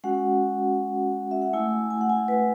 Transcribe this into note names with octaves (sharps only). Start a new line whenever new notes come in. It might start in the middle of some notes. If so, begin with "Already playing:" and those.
G#3 C#4 F#4 F#5
E5
F#5
A3 E4 G#5
G#5
F#5
G#5
B4